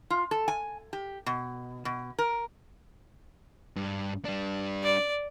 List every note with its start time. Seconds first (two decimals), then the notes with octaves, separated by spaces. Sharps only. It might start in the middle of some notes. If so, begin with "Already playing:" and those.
0.10 F4
0.31 A4
0.48 G#5
0.93 G4
1.26 B2
1.85 B2
2.19 A#4
3.76 G2
4.25 G3 D4
4.83 D5